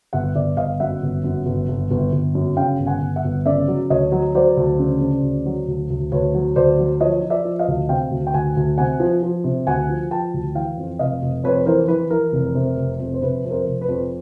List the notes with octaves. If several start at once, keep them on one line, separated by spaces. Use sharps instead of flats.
G1 E5 F#5
G1 D5 E5
G1 D#5 F5
F#2 E5 F#5
G1
F#2
G1
G1
G1
G1
F#2
C#3 F5 G5
G1
F#5 G#5
G1
E5 F#5
G1
C#3 D5 E5
F#3
D2 C#5 D#5
F#3
F#3 C5 D5
D2
C#3
C#3
D2
F#3
D2
D2
D2 B4 C#5
F#3
D2 C5 D5
F#3
F3 C#5 D#5
F3
D5 E5
F3
D#5 F5
D2
C3 F5 G5
D2
G5
D2 F#5 G#5
D2
C3 F#5 G#5
F3
F3
C3
D2 F#5 G#5
F3
F3 G5 A5
D2
E3 F5 G5
F2
F1 D#5 F5
F1
F2 B4 C#5
E3 A#4 C5
E3 B4
E3 A#4
F1
C3
F1
F2
C5
C3 B4
F2
A#4 C5
F1
B4
F2